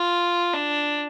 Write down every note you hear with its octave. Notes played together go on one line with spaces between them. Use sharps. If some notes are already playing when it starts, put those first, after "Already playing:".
Already playing: F4
D4